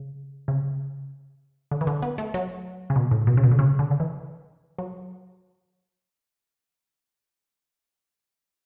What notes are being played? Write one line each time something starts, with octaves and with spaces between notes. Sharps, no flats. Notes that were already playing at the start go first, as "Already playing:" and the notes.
Already playing: C#3
C#3
D3
E3
D3
B3
A3
F#3
C#3
B2
A2
B2
C#3
B2
D3
C#3
D3
D3
E3
F#3